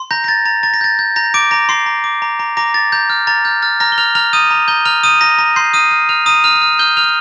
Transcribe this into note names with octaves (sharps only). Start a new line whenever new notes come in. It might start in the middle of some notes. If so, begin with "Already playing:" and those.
Already playing: C6
A#5 G6 A#6
A#6
A#5 A6
A#5 A6
A#5 A6
A#6
G6 A6
G6
A#5 G6 A#6
D6 G6 D7
A#5 D6 A#6
C6 D6 C7
A#5
D6
A#5
A#5
A#5 D6 A#6
A#5 A6
A#5 G6
F6
A#5 A6
F6 G6
F6 A6
A#5 F6 A#6
G7
A#5 F6 F7
A#5 F6 F7
D#6 G6 D#7
A#5
A#5 G6 G7
A#5 F6 F7
D#6 G6 D#7
A#5 A#6
A#5 A#6
C6 G6 C7
D#6 F6 D#7
F6
F6 F7
A#5 D#6 D#7
A#5 F6 F7
F6
F6 G6 G7
F6 F7